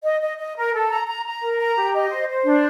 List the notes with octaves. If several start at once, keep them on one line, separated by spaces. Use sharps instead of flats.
D#5
D#5
D#5
A#4
A4
A#5
A#5
A#5
A#4
A#5
G4
D#5
C5
C5
D4